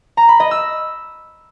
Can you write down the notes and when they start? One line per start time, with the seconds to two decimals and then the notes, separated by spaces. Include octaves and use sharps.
0.17 A#5
0.29 B5
0.40 D#5
0.51 E6